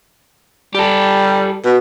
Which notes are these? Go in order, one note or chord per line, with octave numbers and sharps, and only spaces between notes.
G3 G4 A4
B2